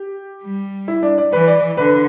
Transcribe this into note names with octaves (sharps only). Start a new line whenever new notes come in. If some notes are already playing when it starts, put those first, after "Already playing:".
Already playing: G4
G3
E4
D4
D5
E3 B4
D5
D3 B4